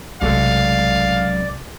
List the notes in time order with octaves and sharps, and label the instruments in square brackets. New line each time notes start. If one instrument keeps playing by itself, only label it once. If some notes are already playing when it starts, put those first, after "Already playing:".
[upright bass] B1 C3 [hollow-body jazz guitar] F#2 G#3 A3 [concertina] D5 [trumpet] F5